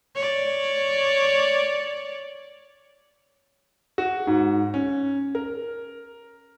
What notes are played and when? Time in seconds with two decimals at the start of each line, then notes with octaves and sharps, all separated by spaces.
0.15 C#5 D5
3.98 F#4
4.27 G#2
4.74 C#4
5.35 A#4